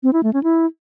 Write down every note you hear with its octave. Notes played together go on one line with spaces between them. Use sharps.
C4
E4
A3
C#4
E4